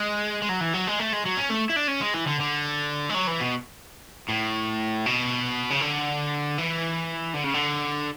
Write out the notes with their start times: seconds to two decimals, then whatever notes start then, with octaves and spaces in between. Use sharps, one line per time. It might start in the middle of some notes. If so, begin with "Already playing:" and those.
Already playing: G#3
0.42 G#3
0.49 F#3
0.61 E3
0.73 F#3
0.87 G#3
0.99 A3
1.13 G#3
1.25 F#3
1.37 C#4
1.50 A3
1.69 E4
1.76 D4
1.88 C#4
2.01 G#3
2.14 E3
2.27 D3
2.40 D3
3.09 G#3
3.15 F#3
3.27 E3
3.40 B2
4.29 A2
5.06 B2
5.70 C#3
5.81 D3
6.58 E3
7.34 D3
7.44 C#3
7.54 D3